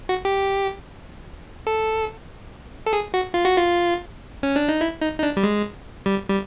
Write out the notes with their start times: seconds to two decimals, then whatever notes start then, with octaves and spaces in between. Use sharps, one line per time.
0.09 F#4
0.25 G4
1.67 A4
2.86 A4
2.93 G#4
3.14 F#4
3.34 F4
3.45 F#4
3.56 F4
4.43 C#4
4.56 D4
4.69 D#4
4.81 E4
5.02 D#4
5.18 D#4
5.23 D4
5.37 G3
5.43 G#3
6.06 G3
6.29 G3